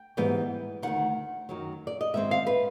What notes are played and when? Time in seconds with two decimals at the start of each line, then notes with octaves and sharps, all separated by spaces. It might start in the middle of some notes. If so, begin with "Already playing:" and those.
Already playing: G5
0.17 G#2 E3 G3 B3
0.83 D2 C3 D#3 F#5
1.49 F#2 D#3 F#3
1.87 D5
2.01 D#5
2.14 G#2 D#3 G#3 C4 E5
2.31 F5
2.47 B4